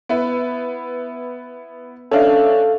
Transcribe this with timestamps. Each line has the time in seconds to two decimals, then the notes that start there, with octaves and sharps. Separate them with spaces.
0.09 B3 E4 B4
2.11 C#4 D4 A4 E5 F5